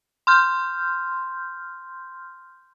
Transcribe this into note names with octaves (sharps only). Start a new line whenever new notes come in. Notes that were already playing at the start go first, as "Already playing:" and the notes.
C6 F6 G6